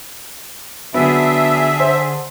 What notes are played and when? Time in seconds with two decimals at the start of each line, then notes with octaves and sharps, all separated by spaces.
0.94 D3 F#3 B3 D4 G#4 E5
1.80 C5